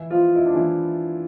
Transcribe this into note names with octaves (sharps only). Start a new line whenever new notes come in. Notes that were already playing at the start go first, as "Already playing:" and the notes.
Already playing: E3 E4
F3 F4
E4
D4
E3 E4